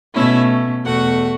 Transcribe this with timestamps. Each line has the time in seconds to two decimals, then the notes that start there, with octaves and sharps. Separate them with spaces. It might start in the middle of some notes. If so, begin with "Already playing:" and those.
0.15 B2 A3 C#4 E4 E5
0.85 E2 B2 A3 F#4 F#5